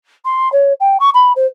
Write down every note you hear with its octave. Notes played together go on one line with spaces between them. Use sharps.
C6
C#5
G5
C#6
B5
C5